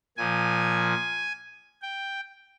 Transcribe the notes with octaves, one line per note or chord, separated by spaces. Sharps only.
A#2 F3 G#5
G5